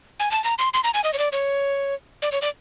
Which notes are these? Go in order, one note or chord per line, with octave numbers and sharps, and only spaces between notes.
G#5
A5
A#5
C6
C6
A#5
G#5
D#5
C#5
D5
C#5
D5
C#5
D5